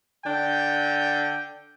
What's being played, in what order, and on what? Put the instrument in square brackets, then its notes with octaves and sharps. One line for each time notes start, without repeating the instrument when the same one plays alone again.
[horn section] D3 D4 G5